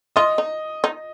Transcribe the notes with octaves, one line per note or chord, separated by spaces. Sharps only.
F4 D#5
D#4
D#4